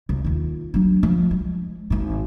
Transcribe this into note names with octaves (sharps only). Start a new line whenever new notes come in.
C2
D#2 F4
F#3 D4
F3
G#3
G#1 G#2